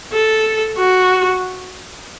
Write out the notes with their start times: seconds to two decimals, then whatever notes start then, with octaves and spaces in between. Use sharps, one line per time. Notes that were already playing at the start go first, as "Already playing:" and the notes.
0.13 A4
0.78 F#4